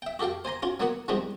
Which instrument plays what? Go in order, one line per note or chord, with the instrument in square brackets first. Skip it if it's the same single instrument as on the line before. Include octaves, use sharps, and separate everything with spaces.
[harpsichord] E5 G5
F#4 G4 A4 F5 G5
C5 G#5 A#5 C6
C#4 F4 F#4
F#3 A#3 B3 B4 F#5
E3 F3 G3 G#3 B3 C4